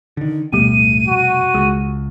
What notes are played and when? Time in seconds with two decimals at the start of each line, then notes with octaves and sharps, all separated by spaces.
0.17 D3 D#3
0.53 D1 A1 B2 G3 A3 D#7
1.08 F1 F#4
1.55 C#2 G#3